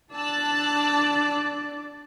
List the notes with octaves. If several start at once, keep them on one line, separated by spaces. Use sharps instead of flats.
D4 D5 A5 E6 F#6